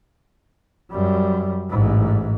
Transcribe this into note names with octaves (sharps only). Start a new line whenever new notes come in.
F#2 G3
A1 G#2